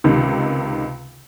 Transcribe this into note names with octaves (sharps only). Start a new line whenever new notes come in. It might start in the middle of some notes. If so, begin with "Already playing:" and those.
C#2 C3 D#3